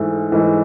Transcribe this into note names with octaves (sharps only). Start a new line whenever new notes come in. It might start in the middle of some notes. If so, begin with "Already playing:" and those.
Already playing: G#2 E3 A3
G#2 E3 A3